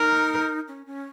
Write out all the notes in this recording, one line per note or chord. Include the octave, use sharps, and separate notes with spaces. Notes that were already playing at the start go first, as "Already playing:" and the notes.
Already playing: D#4 A#4
C#4
C#4